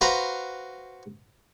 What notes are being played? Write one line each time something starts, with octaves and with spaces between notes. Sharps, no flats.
F#4 B4 C5 F5 A#5 B5